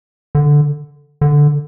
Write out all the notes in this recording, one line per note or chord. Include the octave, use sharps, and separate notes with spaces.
D3
D3